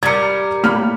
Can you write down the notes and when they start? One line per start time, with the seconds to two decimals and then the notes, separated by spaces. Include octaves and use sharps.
0.03 G3 A#4 G#6 C#7
0.64 A2 A#3 B5 F6